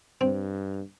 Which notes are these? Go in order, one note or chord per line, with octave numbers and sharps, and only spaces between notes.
G2 C4